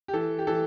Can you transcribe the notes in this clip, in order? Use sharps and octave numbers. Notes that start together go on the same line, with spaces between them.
G4
E3 A4
G4
E3 A4